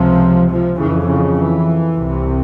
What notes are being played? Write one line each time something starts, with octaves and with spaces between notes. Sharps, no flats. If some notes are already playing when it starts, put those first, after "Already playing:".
Already playing: C#2 C3 F3
F3
F2 C#3 E3
C#3
E3
C2 C3